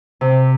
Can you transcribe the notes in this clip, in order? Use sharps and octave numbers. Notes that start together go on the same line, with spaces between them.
C3